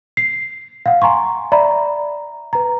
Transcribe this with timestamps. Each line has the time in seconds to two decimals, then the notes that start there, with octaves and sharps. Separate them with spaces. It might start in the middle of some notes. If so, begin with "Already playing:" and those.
0.17 C7
0.86 F5 F#5
1.02 G#5 A#5 C6 C#6
1.52 D5 E5 A#5 B5
2.53 B4 A#5